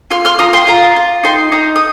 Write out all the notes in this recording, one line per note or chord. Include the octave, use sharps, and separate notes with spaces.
F4 C6 F6
C6 F6
F4 A#5 D#6
G5 C6
F4 F5 A#5
F4
D#4 G5 C6
D#4 A#5 D#6
D#6